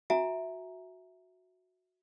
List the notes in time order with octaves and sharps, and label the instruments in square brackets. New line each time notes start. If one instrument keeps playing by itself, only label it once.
[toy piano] F#4 E5 G#5 A#5